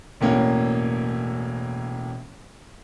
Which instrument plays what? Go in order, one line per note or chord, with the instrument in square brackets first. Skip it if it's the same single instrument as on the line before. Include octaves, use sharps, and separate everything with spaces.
[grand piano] E1 A2 A#3 C#4